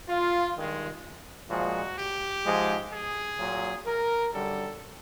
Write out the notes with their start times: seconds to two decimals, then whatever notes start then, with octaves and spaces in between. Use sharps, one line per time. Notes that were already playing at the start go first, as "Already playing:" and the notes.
0.09 F4
0.56 G2 D#3 G#3
1.50 A#2 F3 G#3 F#4
1.98 G4
2.45 G#2 F3 G#3
2.92 G#4
3.39 A#2 F#3
3.86 A#4
4.34 F#2 D3 G3 A4